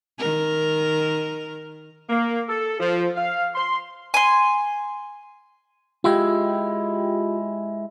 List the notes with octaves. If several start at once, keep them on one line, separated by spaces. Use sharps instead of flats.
D#3 A#4
A#3
A4
F3
F5
C6
G#5 C6
G#3 E4 F4 G4 G5